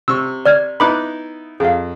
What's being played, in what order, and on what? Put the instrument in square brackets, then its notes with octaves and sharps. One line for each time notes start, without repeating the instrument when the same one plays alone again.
[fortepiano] C3 C#6 [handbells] E6
[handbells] D5 F6 G#6
[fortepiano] B3 D#4 E4 [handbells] B5 D6 F#6
[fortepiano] F2 [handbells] G#4 F5